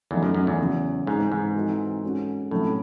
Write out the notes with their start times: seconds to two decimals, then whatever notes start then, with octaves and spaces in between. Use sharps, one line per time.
0.11 E2 F#3 A3 D#4
0.23 F#2
0.34 F#2
0.47 E2
0.59 C#3 F#3 C#4
1.06 G#2 E3 C4 D#4
1.32 G#2
1.55 E3 C4 D#4 F#4 A4
2.03 G#3 C#4 F#4 A4
2.51 A2 C3 F#3 C#4 E4